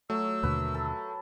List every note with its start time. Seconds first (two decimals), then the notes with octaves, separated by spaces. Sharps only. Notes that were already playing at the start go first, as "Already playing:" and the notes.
0.10 F#3 A3 E6
0.43 D#2 B2 D3 B4
0.74 A4